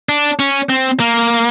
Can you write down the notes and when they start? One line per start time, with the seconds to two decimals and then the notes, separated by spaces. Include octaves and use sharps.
0.09 D4
0.39 C#4
0.69 C4
1.00 A#3